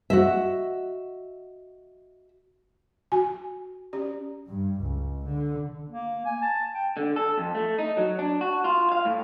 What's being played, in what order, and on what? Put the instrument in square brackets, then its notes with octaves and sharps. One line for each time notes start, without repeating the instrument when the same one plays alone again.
[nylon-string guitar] F#4 D#5 E5
[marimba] F#4 G#5
[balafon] C#4 G4 D5
[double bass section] G2
C#2
D3
[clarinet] A#3
G#5
A5
G5
[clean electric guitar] D3
A4
F2
A3
D#4
F#3
D4
F#4
F4
F5
A2